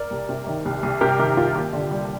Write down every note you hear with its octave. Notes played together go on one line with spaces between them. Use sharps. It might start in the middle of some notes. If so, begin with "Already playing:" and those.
Already playing: A#4 D5
C2
C3
D#3
C2
C2
C3 G4 A#4
D#3 G4
C2 F4
D#2 G4
D3
G3